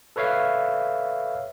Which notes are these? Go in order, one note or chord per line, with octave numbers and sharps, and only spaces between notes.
A4 B4 C#5 E5 F5